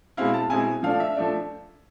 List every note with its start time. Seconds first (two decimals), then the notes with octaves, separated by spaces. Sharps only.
0.17 B2 G#3 C4 E4 F5
0.34 A5
0.50 B2 G#3 C4 E4 G#5
0.83 F3 A3 D4 F5
1.00 E5
1.16 F3 A3 D4